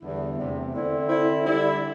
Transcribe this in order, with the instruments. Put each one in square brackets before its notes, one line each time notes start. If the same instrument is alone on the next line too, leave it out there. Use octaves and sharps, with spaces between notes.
[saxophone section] E2 D3 G3 E4
E2 C3 A3
D3 C4 E4
D3 C4 E4
D3 G3 E4